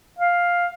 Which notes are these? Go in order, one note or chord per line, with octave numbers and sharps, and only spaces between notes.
F5